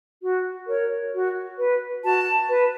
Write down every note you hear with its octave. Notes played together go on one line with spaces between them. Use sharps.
F#4
A#4 C#5
F#4
B4
F#4 A5
B4